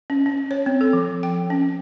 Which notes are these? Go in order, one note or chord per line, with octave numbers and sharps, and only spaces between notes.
C#4
C#4
C#5
C4
A4
F3
G5
C#4